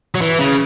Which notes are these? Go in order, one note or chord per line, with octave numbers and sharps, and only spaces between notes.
F#3
E3
C#3